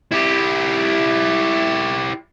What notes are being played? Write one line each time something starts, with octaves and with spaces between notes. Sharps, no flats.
E4 G4